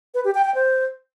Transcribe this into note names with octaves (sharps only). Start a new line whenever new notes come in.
B4
G4
G5
G5
C5